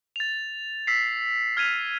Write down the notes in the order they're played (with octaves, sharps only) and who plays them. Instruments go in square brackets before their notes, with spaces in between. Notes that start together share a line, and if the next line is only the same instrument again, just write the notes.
[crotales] A6 F7
E6 B6 C7
F6 G#6 B6 D#7 F7